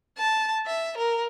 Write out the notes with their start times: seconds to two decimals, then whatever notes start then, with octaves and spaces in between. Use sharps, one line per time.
0.18 A5
0.66 E5
0.98 A#4